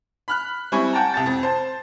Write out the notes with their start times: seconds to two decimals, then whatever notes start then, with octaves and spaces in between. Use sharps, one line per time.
0.28 B5 F6 F#6
0.72 G3 C4 E4 G#5 C#6
0.93 F#5 G5 A5 A#5
1.14 C2 A5 A6
1.26 F2
1.43 C5 A5